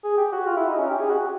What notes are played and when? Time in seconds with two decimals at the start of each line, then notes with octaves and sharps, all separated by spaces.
0.04 G#4
0.17 G4
0.32 F#4
0.47 F4
0.57 E4
0.68 D#4
0.79 C#4
0.90 G4
1.00 G#4
1.10 F#4